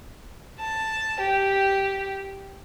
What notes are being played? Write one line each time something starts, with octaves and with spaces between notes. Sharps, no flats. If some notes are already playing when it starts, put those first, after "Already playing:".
A5
G4